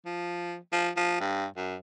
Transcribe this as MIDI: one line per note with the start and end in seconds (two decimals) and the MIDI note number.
0.06 0.56 53
0.72 0.89 53
0.96 1.18 53
1.20 1.46 43
1.56 1.75 42